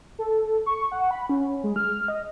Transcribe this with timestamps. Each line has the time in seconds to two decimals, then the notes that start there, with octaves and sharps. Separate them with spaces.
0.19 A4
0.66 C#6
0.92 F#5
1.11 B5
1.29 C#4
1.64 G#3
1.76 F6
2.08 D#5